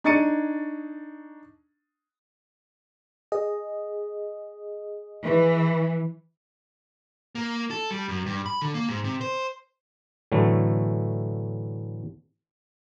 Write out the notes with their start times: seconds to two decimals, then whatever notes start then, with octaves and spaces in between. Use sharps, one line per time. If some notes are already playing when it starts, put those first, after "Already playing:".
0.04 D4 D#4 C#6 A6 C#7 D#7
3.32 G#4 D#5
5.23 E3
7.35 A#3
7.71 A4
7.91 G3
8.08 F#2
8.26 G2
8.46 B5
8.62 D3
8.74 A#3
8.89 G#2
9.04 C3
9.21 C5
10.32 A2 D3 E3 F#3 A3